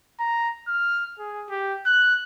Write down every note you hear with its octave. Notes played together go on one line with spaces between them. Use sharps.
A#5
F6
G#4
G4
F#6